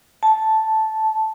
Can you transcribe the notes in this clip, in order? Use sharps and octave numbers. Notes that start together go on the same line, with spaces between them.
A5